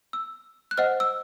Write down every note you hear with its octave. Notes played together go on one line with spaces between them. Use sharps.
E6
F#6
C5 D#5 F#5 F6
E6